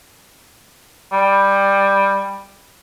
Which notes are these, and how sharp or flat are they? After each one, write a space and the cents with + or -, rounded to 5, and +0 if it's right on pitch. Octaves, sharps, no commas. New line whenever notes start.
G3 +10